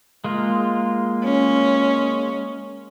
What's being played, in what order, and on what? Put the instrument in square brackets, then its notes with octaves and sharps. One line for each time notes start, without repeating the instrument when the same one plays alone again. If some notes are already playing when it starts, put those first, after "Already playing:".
[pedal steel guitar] G#3 A#3 F4
[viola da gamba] C#4